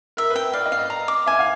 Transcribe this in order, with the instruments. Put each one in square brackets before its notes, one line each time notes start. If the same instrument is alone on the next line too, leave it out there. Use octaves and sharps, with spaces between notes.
[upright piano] A#4 [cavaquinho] E5
[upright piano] B4
[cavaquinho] G5
[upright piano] D5 [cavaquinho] F5
[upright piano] D#5
[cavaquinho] F5
[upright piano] D#5
[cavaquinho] A#5
D6
[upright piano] E5 [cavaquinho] G#5
[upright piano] F5